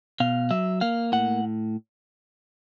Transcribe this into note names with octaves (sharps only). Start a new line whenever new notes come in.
B2 F5
F#3 E5
A#3 F5
A2 F#5